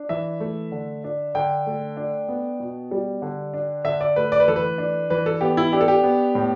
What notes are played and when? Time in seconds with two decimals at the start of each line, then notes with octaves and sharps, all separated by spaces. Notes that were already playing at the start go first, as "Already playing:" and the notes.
Already playing: D4
0.09 E3 E5
0.40 A3
0.72 D3
1.04 D4
1.35 D3 G5
1.67 A3
1.97 D4
2.28 B3
2.60 B2
2.91 G3
3.22 D3
3.54 D4
3.84 D3 E5
4.01 D5
4.16 A3 B4
4.32 D5
4.40 B4
4.48 E3 A4
4.56 B4
4.78 D4
5.10 E3 B4
5.26 A4
5.41 B3 G4
5.57 E4
5.73 D4 G4
5.81 A4
5.88 G4
6.03 B3
6.35 A2